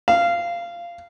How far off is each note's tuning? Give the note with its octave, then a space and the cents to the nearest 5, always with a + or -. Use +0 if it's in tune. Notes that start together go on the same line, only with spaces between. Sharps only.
F5 -15